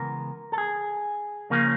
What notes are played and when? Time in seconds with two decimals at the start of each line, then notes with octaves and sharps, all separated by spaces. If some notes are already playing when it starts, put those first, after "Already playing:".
Already playing: C#3 E3 G#3 B3 A#4
0.52 A4
0.58 G#4
1.50 C#3 F3 A#3 C#4